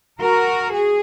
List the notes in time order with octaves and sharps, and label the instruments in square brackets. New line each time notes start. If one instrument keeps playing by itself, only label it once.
[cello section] F#4 A#4
G#4